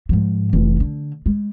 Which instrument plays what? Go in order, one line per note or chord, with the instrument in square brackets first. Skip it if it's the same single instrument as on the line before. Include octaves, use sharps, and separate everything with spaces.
[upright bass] G#2 F3
F1 E3
D3
G#3